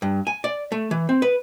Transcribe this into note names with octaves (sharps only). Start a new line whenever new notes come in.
G2
G#5
D5
A3
E3
C4
B4